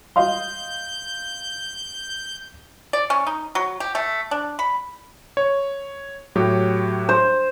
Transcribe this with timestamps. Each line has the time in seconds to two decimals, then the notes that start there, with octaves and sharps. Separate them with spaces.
0.16 D#5 F5 C6 G6
2.93 D5
3.10 C#4
3.27 D#4
3.55 F#3
3.80 G4
3.95 A3
4.31 D4
4.59 B5
5.37 C#5
6.35 A2 F#3 G4
7.09 C5